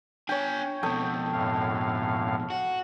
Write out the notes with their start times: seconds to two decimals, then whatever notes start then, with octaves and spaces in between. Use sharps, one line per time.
0.29 D4 C#5 G5 G#5
0.83 F2 B2 A4 G5 D#6
1.32 F#2 A2 F5
2.50 F#4